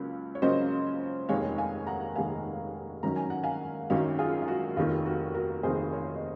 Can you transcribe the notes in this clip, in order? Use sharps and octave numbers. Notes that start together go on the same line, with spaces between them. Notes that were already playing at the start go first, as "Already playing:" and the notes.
Already playing: C#2 C#3 F#3 A#3 C#4
C#5
C#2 C#3 F#3 A#3 C#4 C5 D#5
F1 D#2 D#3 G#3 C#5 F5
F5 G#5
F#5 A#5
F1 D#2 D#3 G#3 F5 G#5
G#1 F#2 D#3 F#3 C#4 A#5
G#5
F#5
F5 G#5
G#1 F#2 D#3 F#3 C#4 C#5 F5
F4 G#4
F4
F#4
F1 D#2 D#3 F4
F#4
F#4 A#4
F1 D#2 D#3 G#4 C5
A#4 C#5
D#5